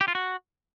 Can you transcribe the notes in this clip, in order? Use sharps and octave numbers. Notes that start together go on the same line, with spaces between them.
G4
F4
F#4